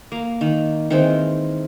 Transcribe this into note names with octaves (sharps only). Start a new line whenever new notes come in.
A#3
D#3
D#3 E3 G#3 C4